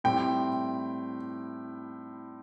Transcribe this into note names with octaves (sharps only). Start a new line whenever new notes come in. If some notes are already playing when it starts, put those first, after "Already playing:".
A2 G3 C4 E4 G5